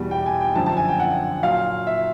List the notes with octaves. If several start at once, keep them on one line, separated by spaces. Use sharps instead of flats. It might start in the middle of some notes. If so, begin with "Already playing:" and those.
Already playing: E2 B2 G3
G5
G#5
G5
F#2 D3 F3 A5
A5
G#5
G5
F#5
A#2 F#3 F5
E5